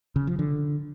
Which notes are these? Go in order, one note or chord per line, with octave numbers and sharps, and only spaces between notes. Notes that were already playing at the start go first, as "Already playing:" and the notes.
C#3
F3
D3